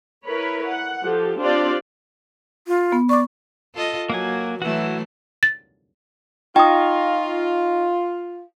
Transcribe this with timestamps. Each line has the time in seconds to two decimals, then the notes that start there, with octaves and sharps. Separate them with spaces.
0.23 E4 A#4 B4 C#5 B5
0.66 F#5
1.03 F3 G4 A4
1.39 C4 D4 F4 G4 D5
2.67 F4
2.92 B3
3.09 D5 C#6 D6
3.74 F4 A4 D#5
4.10 F#3 A#3 F#4 G#5
4.62 E3 F#3 A3 E4 F#4
5.43 A6
6.56 D#4 F4 D#5 G5 C#6 D#6